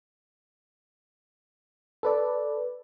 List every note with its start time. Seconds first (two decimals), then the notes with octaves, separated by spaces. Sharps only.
2.03 A4 B4 D5